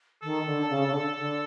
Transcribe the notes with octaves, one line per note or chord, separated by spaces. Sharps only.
D#3 A4
D3
C#3
C#3
D3
D3